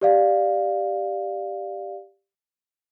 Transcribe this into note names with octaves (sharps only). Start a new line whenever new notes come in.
G4 D5 F5